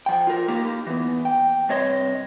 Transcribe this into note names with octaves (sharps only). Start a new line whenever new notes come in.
F3 G5
F4 A#4
A#3 D#4 G4 A#4
E3 B3
G5
G2 C3 C#5 D#5 A#5 C6